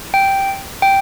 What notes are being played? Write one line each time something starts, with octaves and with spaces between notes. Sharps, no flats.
G5
G5